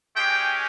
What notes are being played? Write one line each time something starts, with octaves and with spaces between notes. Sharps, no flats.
G#3 C#4 G4 G5